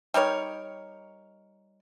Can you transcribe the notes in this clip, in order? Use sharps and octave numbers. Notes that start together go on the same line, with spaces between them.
G3 D#4 A#4 C#5